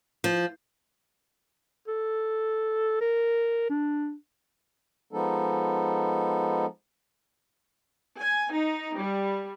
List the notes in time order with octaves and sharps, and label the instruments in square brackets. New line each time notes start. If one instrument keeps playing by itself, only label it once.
[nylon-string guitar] F3
[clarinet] A4
A#4
D4
[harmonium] F3 G#3 B3 D#4 A4
[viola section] G#5
D#4
G3